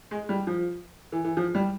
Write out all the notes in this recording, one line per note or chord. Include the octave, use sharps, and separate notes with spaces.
G#3
G3
F3
E3
E3
F3
G3